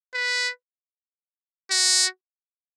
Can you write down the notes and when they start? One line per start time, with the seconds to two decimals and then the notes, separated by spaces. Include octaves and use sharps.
0.14 B4
1.71 F#4